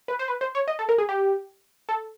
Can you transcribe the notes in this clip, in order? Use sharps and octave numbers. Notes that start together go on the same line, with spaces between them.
B4
C5
B4
C5
C#5
D#5
A4
A#4
G#4
G4
A4